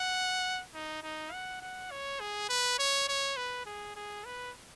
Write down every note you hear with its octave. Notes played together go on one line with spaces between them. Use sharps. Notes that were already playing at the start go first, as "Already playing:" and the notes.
Already playing: F#5
D#4
D#4
F#5
F#5
C#5
G#4
B4
C#5
C#5
B4
G#4
G#4
B4